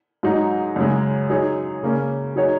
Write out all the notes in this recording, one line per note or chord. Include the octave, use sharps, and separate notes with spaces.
G#2 F#3 D#4
F#2 C#3 G#3
F#3 D#4 G#4 C#5
C#3 A#3 C#4
F#3 D#4 G#4 C#5